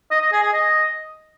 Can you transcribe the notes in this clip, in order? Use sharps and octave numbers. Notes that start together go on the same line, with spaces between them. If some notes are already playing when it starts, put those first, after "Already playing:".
D#5
D#5
G#4
G#4
D#5